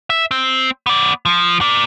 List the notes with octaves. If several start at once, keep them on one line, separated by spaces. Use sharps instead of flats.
E5
C4
B3 D5
F3
A#4 D5